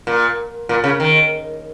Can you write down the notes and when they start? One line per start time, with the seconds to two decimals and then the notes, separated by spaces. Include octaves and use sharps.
0.07 A#2
0.69 A#2
0.84 C#3
1.00 D#3